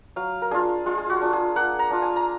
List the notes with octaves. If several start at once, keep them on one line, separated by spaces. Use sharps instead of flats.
F#3 F5
A#4
D4 F4 G#4
G#3 F4
G#4
F#4
D4 F4
G#4
A#3 F#5
A#5
D4 F4
G#5
A#5